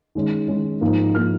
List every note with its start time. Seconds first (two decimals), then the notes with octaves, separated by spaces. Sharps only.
0.15 D#3 G#3 C#4
0.48 D#3 G#3 C#4
0.81 G#2 F3 A#3 D#4
1.15 F3 A#3 D#4 F6